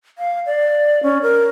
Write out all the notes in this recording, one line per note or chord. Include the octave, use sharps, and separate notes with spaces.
F5
D5
C#4
A#4